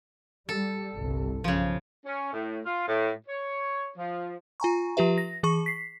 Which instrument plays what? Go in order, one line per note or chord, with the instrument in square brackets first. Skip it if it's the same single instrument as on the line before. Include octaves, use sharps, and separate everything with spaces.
[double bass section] G3 [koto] A4
[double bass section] G1 C2
[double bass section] B1 G2 [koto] C#3 F3
[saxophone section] C#4
A2
F4
A2
C#5
F3
[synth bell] F4 G#5 A#5 C#6
F3 F4 G4 B4 E5
A#6
E3 G#4 C#6
B6 C7